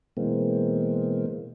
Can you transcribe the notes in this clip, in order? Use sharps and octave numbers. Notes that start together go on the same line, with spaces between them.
B2 E3 G#3 A#3 C4